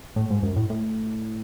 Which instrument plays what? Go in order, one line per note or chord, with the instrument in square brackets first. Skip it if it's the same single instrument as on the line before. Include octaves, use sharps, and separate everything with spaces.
[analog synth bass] A2
G#2
F#2
A2
A2